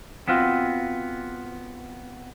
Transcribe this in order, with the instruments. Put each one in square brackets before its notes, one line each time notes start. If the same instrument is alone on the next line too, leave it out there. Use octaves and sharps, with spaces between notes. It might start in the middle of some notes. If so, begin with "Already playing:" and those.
[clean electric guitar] B3 C4 F4 F#4